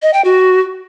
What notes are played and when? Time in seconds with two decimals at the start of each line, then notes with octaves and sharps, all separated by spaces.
0.02 D#5
0.13 G5
0.25 F#4